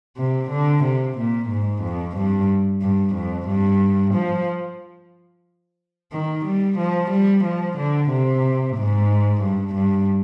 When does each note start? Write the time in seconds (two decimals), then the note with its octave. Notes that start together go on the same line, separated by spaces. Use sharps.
0.17 C3
0.50 D3
0.84 C3
1.17 A#2
1.49 G#2
1.82 F2
2.16 G2
2.82 G2
3.15 F2
3.48 G2
4.14 F3
6.12 D#3
6.45 G3
6.78 F3
7.11 G3
7.44 F3
7.78 D3
8.10 C3
8.77 G#2
9.42 G2
9.75 G2